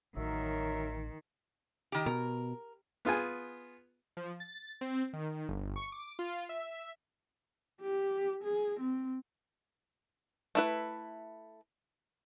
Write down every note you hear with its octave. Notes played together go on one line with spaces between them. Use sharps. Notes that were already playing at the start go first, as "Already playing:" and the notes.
A1 D#3 F#3 A#4 E5
D#3 G4
B2 A#4
B3 F4 G#4 G#5
F3
A6
C4
D#3
G1
C#6
D6
F4
E5
G4
G#4
C4
A3 E4 B4